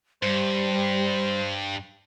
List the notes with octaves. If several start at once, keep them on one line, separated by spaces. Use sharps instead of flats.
G2 G3 C5